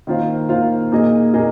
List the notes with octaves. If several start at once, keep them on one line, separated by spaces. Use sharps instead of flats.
D#3 A#3 F4 C5 F5
D#3 A#3 F4 C5 F5
A#2 A#3 D#4 G#4 D#5
A#2 A#3 D#4 G#4 D#5